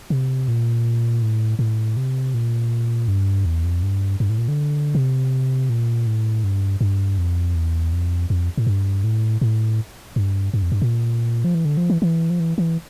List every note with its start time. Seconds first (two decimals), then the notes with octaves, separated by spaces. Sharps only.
0.10 C3
0.48 A#2
1.22 A2
1.59 A2
1.97 C3
2.34 A#2
3.08 G2
3.46 E2
3.64 F2
3.83 G2
4.20 G2
4.29 A2
4.38 A#2
4.48 D3
4.95 C3
5.70 A#2
6.07 A2
6.44 G2
6.81 G2
7.18 F2
7.55 E2
7.93 F2
8.30 F2
8.57 A2
8.67 G2
9.04 A2
9.41 A2
10.16 G2
10.54 G2
10.62 F2
10.72 G2
10.82 A#2
11.44 F3
11.55 E3
11.65 D3
11.77 F3
11.90 E3
12.02 E3
12.30 F3
12.40 E3
12.58 E3